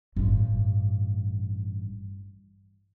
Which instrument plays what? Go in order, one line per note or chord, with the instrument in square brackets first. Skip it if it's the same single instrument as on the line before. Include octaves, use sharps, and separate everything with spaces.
[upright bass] A1 G2